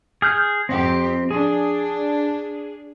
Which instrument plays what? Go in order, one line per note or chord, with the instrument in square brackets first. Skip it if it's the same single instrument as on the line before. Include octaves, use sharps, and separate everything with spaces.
[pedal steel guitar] G#4 F6 G6
[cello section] F2 G4 [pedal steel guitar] C4
[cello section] D4 [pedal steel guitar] G#4